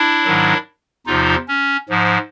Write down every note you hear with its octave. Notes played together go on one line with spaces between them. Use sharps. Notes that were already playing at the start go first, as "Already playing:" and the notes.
Already playing: D4 E4
G#2 D#3 F#3
E2 C3 F3 D#4 F4
C#4
G#2 F3